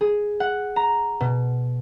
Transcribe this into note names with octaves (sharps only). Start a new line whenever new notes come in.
G#4
F#5
A#5
B2